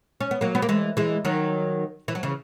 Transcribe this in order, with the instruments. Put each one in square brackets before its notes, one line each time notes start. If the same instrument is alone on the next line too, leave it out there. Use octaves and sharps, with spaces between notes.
[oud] C#4
B3
F#3 A#3
B3
A#3
E3 G#3
E3 G#3
D#3 F#3
E3
F#3
C#3 E3